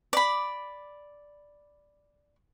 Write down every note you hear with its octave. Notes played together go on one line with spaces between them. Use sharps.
D5 B5